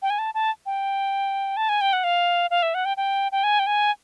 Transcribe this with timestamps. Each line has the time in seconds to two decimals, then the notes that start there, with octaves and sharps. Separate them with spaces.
0.02 G5
0.10 G#5
0.19 A5
0.34 A5
0.66 G5
1.57 A5
1.69 G#5
1.81 G5
1.93 F#5
2.04 F5
2.51 F5
2.63 E5
2.74 F#5
2.85 G5
2.97 G5
3.32 G5
3.44 G#5
3.59 G5
3.67 G#5